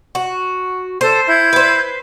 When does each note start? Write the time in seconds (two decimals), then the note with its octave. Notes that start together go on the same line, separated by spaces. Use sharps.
0.15 F#4
1.01 A4 C5
1.27 E4 G6 G#6
1.53 B4 C5